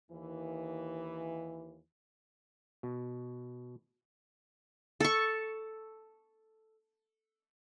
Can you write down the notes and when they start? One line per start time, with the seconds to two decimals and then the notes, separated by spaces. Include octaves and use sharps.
0.10 D#2 E3
2.83 B2
5.00 A4 C#6